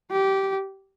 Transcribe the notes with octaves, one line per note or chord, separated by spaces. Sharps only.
G4